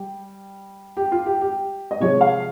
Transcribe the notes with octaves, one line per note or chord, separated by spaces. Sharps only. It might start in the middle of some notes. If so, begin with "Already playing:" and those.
Already playing: G3 G4
G4
F4
G4
G4
D#5
C3 F3 G#3 C#5
F5